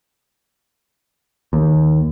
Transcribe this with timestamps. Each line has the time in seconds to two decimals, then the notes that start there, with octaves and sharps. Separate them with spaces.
1.53 D#2